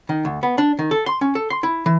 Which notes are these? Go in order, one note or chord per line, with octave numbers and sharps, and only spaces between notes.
D#3
D2
B3
D4
D#3
A4
C6
C#4
A4
C6
E4
E3